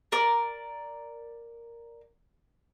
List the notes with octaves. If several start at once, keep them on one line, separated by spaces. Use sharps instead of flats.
A#4 D5